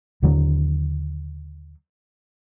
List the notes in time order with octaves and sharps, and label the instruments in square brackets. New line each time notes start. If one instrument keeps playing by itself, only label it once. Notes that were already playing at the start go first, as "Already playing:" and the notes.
[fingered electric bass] D#2 D3 F#3